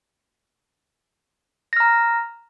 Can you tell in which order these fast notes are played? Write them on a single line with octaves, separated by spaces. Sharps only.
A#6 F6 A#5